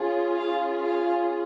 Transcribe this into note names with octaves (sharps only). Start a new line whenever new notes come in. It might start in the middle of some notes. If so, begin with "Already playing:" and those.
Already playing: C#4 F4 G#4
F5
F5